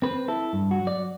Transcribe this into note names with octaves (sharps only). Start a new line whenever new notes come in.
C4 B4
E4 A4
G2
F#4
F#3
D5